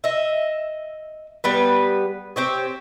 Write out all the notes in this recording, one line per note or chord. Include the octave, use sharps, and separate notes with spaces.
D#5 E5
G3 B3 B4
C4 G4 C#5